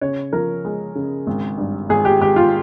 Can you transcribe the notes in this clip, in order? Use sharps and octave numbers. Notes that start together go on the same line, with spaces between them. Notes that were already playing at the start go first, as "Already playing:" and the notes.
C#3 C#5
F3 A#4
G#3
C#3
G#1
G2
G#1 G#4
G4
G#1 G4
F4